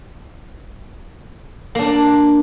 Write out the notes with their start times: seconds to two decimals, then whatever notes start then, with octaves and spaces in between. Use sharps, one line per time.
1.75 A#3 D4